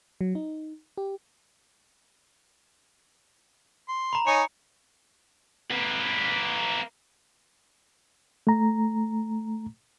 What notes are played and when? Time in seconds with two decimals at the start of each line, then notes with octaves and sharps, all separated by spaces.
0.21 F#3
0.35 D#4
0.98 G4
3.89 C6
4.13 A#5 B5
4.27 D#4 C#5 G#5 C#7
5.70 A#3 B4
8.47 A3 A#5